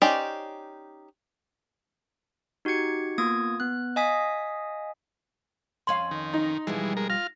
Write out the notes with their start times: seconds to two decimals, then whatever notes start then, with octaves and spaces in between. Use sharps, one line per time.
0.02 C#4 D#4 G4 C5 D5
2.65 D#4 F#4 G4 G#6 C#7
3.18 A#3 B3 F4 D#6 G#6
3.60 B3 F#6
3.96 D#5 F5 G#5 D#6 B6
5.87 F2 C#4 F5 C6 F#7
6.11 D#3
6.33 D#4
6.67 B2 E3 F3 G3 G#3
6.97 G#3 A#4
7.10 F4 F6 A#6